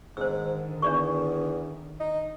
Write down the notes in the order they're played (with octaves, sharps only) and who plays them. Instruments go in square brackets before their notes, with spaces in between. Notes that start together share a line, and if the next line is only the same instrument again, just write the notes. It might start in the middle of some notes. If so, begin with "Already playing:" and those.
[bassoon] G#2 [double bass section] D3 D#3 [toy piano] C5 E6
[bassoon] E2 [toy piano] D4 D5 C#6
[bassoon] D#4